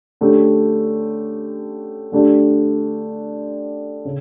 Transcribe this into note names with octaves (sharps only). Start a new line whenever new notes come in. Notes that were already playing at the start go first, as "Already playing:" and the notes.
D3 A3 C#4 G4
D3 A3 D4 G4
C#3